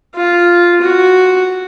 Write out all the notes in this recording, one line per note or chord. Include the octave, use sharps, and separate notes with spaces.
F4
F#4